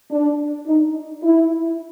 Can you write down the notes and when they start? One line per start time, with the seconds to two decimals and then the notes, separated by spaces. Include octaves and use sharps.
0.11 D4
0.67 D#4
1.23 E4